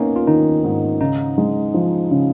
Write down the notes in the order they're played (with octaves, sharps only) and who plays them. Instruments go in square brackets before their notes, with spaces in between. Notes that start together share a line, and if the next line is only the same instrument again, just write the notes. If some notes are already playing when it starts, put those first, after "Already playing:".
Already playing: [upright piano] A#3 [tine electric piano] B3 C#4 D#4
[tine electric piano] F4
[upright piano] D#3 [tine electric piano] D#4
[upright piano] G#2
[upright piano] C#3 [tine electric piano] D#4
[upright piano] G#3
F3
C#3